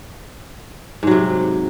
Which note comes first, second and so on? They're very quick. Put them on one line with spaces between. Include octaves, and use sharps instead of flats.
G#2 F#3 C3